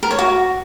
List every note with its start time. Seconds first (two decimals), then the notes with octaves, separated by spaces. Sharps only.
0.03 A#4
0.11 C#5
0.19 F#4